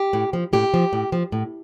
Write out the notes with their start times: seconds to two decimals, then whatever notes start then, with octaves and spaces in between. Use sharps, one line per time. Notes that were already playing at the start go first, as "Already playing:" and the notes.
Already playing: G4
0.13 A2
0.33 F3
0.53 A2 G4
0.74 F3
0.93 A2
1.12 F3
1.32 A2